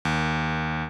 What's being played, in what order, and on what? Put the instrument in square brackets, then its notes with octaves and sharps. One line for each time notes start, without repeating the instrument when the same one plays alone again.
[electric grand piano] D#2